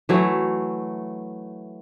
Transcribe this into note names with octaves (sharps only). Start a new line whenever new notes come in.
E3 F#3 A3